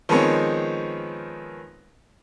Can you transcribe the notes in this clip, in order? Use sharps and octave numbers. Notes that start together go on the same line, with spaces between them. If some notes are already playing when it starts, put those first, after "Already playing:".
D#3 F3 G#3 B3 C4 C#5